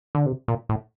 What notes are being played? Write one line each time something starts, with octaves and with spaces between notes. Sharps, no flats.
D3
C3
A#2
A2